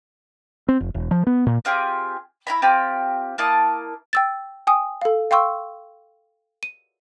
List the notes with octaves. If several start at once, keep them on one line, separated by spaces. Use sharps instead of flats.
C4
F1
E1
F3
B3
A#2
C4 F4 G4 G#4
E4 A#5 B5
C4 F4 G4
A#3 E4 A5 D#6
G5 E6 A6
G5 G#5 D#6
A4 F5
F5 G5 C6 C#6 E6
D#7